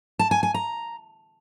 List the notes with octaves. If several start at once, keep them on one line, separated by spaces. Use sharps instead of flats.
A5
G#5
G#5
A#5